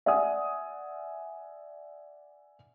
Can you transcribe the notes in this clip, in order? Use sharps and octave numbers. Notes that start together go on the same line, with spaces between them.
D5 E5 F#5 G#5 D#6